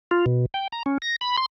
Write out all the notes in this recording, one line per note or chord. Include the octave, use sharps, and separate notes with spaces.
F4
B2
G5
A#5
C#4
A#6
B5
C6